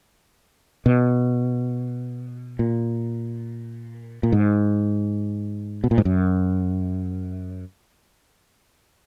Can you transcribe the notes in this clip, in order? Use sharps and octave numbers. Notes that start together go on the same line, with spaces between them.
B2
A#2
A#2
G#2
B2
A#2
G#2
F#2